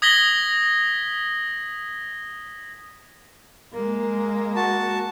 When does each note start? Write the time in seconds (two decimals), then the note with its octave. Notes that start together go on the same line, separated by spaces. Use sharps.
0.02 D#6 G#6 A#6 B6 F#7 G7
3.73 G#3 A#3
4.56 F#4 A5